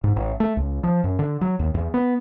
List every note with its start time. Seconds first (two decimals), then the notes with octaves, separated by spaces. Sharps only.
0.04 G#2
0.16 A1
0.40 A3
0.57 C#2
0.83 F3
1.04 F#2
1.19 D3
1.41 F#3
1.59 D#2
1.74 E2
1.94 B3